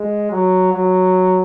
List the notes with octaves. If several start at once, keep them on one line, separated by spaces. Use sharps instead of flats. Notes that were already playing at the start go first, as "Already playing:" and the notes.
Already playing: G#3
F#3
F#3